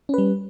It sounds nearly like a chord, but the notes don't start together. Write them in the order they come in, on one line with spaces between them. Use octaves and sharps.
C#4 B4 G3